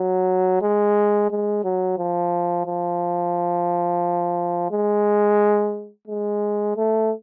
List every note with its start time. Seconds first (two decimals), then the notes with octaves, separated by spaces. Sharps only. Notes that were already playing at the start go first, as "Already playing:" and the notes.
Already playing: F#3
0.61 G#3
1.30 G#3
1.64 F#3
1.98 F3
2.67 F3
4.71 G#3
6.07 G#3
6.76 A3